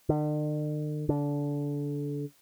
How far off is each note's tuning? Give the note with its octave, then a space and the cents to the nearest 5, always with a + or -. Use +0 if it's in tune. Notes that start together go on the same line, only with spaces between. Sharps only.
D3 +45
D3 -25